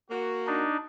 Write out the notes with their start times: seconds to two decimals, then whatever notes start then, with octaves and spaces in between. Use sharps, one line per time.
0.10 A#3 F#4
0.47 D4 D#4